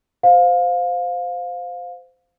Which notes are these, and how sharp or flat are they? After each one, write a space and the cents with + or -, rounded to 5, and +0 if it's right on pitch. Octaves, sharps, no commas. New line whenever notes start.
C5 -20 F5 +20